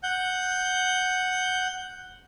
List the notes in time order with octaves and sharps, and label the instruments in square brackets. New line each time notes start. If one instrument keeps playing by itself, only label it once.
[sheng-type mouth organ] F#5 G6